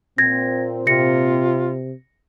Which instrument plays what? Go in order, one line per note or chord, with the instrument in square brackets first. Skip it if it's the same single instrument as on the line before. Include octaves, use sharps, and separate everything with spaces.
[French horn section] A#2 C4 [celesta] G#6 A#6
[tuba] C3 [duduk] F4 [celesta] A#6 C#7